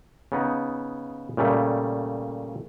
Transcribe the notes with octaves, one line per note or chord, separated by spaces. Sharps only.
C#3 B3 D#4
A#2 C#3 G3 A3